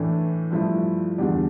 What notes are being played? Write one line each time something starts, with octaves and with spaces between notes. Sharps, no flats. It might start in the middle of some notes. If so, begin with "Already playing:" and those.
Already playing: A2 E3 A3 D4
G2 F3 A3 E4
E2 D3 G3 D4